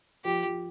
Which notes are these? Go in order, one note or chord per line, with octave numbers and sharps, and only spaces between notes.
F3 G4
F3